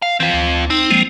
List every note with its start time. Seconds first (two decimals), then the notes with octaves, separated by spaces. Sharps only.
0.02 F5
0.20 E3 C4 F4
0.33 D2
0.70 C4 D#4
0.91 F3 G#3 A#3